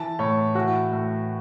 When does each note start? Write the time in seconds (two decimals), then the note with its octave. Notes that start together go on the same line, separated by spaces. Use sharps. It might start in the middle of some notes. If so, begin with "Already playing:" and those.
Already playing: E3 A5
0.19 A2 C#5
0.55 E3 F#4
0.92 A2